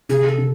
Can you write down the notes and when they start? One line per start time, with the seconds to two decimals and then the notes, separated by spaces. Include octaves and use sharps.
0.09 C3 G#4
0.28 A4
0.38 C3